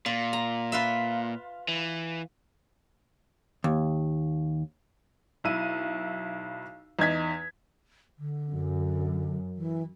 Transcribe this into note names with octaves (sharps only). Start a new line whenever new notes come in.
A#2 F4
A#5
F4 B4 E5
E3
D#2
B1 E4 E6 D#7
E2 D#4 G#6 B6
D3
F#2
E3